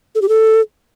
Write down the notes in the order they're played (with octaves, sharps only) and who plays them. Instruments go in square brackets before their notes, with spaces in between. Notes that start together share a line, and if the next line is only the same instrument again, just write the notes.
[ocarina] A4
G4
A4